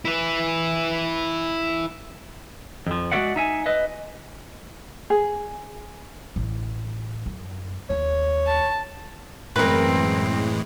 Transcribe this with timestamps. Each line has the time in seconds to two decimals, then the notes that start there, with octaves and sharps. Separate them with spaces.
0.05 E4 B4
2.87 F2 F3
3.12 G#3 A3 F#4 D5 E5 F#5
3.36 D#4 E5 G#5
3.66 B4 D#5 E5
5.10 G#4
6.36 A1
7.26 F#2
7.90 D#2 C#5
8.46 A5
9.56 F#2 A2 E3 G#3 C4 A#4 B4